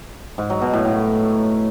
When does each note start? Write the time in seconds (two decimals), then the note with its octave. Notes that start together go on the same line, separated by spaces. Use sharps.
0.38 G#2
0.50 F#3
0.62 B2
0.73 A2
0.85 A2